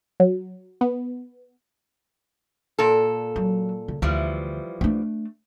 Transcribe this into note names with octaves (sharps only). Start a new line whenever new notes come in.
F#3
B3
A#2 A4
F#3
C#3
D2 E3 F3 G3
A3 D4